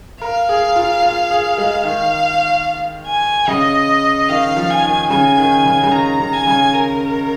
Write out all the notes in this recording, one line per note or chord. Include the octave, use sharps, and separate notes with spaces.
A#4 F5
G#4
F4
F4
G#4
G#3
D#3 F5
G#5
C#3 D#5
D#3 F5
F3
G#5
D#3
C#3 G#5
D#3
C#3
C#3
D#3 A#5
C#3
G#5
C#3
A#4